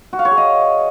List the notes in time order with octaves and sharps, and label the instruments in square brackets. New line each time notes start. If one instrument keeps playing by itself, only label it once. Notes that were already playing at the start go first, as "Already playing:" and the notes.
[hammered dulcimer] F#4
F5
C#5
G#4
D#5